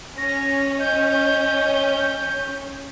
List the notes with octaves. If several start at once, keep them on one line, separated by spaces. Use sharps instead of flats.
C#4 A#6
D#5 G6